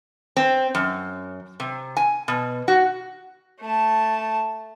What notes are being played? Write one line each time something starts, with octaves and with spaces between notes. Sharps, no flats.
C4
F#2
C3
G#5
B2
F#4
A3 A5